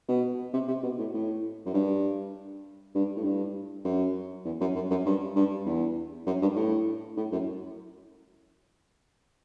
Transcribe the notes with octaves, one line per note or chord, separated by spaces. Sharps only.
B2
C3
C3
B2
A2
A2
F#2
G2
G2
A2
G2
F#2
E2
F#2
F#2
F#2
G2
G2
E2
F#2
G2
A2
A2
F#2